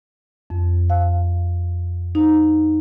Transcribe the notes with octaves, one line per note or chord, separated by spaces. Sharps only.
F2
F5
D#4